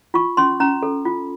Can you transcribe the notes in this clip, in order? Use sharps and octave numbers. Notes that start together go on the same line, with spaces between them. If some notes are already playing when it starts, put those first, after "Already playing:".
F4 C#6
C#4 C6
C#4 A#5
A4
F4